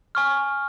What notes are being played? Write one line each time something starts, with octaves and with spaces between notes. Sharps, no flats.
G#5 C#6 F6